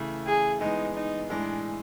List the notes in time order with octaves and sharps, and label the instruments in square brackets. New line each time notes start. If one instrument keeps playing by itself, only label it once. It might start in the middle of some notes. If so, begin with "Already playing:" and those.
Already playing: [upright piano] C#3 E3 A3
[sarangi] G#4
[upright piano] E3 G#3 B3 [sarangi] D#4
[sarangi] D#4
[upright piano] A2 E3 G#3 [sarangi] D4